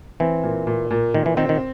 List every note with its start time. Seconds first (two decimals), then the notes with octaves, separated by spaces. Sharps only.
0.20 E3 C4
0.43 A#2
0.67 A#2
0.91 A#2
1.14 A#2 D#3
1.26 E3
1.37 D#3 C4
1.49 D#3